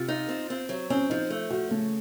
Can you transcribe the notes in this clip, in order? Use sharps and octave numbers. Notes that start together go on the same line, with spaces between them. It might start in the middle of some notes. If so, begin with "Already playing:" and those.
Already playing: C3 F4
D#4
C4
C4
F#3
C4 C#4
F3 D#4
A3
F3 F#4
C#3 A3